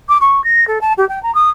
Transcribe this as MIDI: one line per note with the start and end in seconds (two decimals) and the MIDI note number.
0.09 0.17 86
0.21 0.42 85
0.44 0.67 94
0.67 0.81 69
0.81 0.93 81
0.97 1.07 67
1.09 1.21 79
1.23 1.33 82
1.34 1.49 87